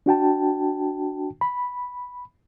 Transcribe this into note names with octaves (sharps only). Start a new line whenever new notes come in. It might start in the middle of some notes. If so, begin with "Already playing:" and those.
D4 F#4 G5 A5
B5